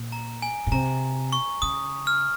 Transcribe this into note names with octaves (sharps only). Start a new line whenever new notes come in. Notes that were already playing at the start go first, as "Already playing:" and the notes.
Already playing: A#2
A#5
G#5
A#2
C3 A#5
C#6
C#3 D#6
F6